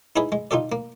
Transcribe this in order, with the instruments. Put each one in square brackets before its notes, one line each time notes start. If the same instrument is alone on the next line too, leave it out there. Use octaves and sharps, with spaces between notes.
[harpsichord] D#4 E4 G#4 B4 D#5
G#3
D#4 F4 G4 A4 D5
A#3